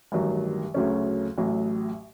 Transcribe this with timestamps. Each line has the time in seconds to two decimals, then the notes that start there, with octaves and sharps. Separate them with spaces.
0.12 A1 G2 D#3 F#3
0.74 D2 C#3 F#3 A3 C#4
1.38 A1 A2 F#3